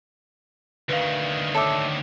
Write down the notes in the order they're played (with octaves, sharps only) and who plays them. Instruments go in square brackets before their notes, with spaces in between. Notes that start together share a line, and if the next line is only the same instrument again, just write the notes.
[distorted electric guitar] D2 D#3 [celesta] B4 F5
[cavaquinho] A4 E5 [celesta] C#5 D6